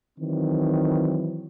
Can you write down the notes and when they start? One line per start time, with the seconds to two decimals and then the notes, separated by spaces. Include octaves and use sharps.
0.18 D#3 E3 F#3 C4